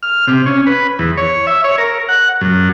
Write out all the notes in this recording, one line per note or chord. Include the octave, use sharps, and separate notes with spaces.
F6
C3
C#4
B4
E2
C#5
E5
C#5
A#4
F#5
F#2